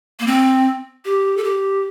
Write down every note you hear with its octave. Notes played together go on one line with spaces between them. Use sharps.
A#3
C4
G4
A4
G4